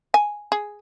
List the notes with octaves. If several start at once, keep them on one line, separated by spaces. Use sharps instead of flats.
G#5
G#4